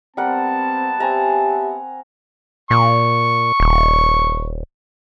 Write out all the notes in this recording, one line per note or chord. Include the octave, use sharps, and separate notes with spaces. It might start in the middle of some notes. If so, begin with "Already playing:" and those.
G3 B3 C4 A#4 F#5 A5
C4 G4 E5 G#5 A#5
A#2 C#6
D#1